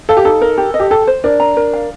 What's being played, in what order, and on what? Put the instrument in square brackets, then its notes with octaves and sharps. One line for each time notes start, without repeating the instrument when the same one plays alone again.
[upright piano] A4 [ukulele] F5
[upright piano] G4
[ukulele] D#4 [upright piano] A4
[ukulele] A#4
G4
D#5
[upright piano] G4
[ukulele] G4 [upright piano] A4
[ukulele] C5
[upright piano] D4 [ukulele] A#4
[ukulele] A#5
A#4
F5